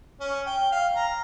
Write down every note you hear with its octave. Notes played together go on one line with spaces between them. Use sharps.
C#4
G5
F5
A#5